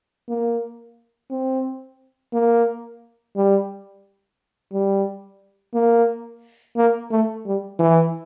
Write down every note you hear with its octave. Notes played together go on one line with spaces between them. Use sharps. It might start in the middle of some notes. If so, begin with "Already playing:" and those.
A#3
C4
A#3
G3
G3
A#3
A#3
A3
G3
E3